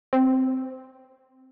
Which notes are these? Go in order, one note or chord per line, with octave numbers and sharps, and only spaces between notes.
C4